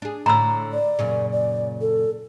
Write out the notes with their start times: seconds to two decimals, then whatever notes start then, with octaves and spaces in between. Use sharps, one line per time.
0.02 D4 G#4
0.26 A2 D3 A#5 B5 E6
0.73 D5
0.99 F#2 A#2 C#3
1.32 D5
1.81 A4